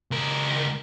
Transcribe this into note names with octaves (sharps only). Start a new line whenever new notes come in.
C#2 A#4